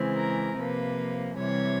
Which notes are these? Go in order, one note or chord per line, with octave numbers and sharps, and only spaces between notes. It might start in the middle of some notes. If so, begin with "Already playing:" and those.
Already playing: C#3 E3 G#3 C4
A#4
C3 F3 A#3 B4
C3 E3 G3 C4 C#5